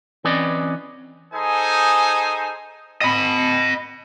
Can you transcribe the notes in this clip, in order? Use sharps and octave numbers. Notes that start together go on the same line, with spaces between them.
E3 C4 C#4 B4 D5 D#5
D#4 G#4 A4 C5 G#5 D#6
D#5 B5